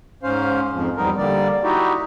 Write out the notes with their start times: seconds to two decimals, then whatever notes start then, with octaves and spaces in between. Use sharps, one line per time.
0.23 G#2 C#4 C5 F5
0.73 F2 G#2 F3
0.97 E2 G3 B3 D#4 A#4
1.17 D3 G3 A#3 D5
1.63 D#4 E4 F#4 G4